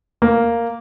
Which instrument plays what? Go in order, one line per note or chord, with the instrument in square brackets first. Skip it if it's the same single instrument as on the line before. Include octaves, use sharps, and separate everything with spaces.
[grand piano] A#3